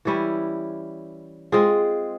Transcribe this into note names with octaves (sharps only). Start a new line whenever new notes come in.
E3 G3 C#4 E4
G#3 C4 F4 G#4